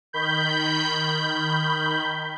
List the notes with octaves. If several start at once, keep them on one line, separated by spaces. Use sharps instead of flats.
D#3 B5 G6